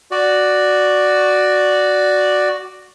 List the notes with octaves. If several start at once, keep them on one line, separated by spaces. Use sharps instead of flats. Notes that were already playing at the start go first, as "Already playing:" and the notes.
F#4 D5